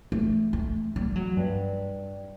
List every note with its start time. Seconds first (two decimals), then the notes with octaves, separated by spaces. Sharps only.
0.12 A3
0.53 A3
0.96 G3
1.16 F#3
1.37 G2